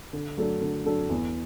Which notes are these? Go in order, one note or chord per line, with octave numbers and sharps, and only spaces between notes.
D3
F#3 A3 D4 A4
D3
F#3 A3 D4 A4
E2